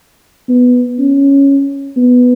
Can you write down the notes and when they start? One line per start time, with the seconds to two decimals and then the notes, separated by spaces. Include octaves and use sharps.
0.49 B3
0.99 C#4
1.97 B3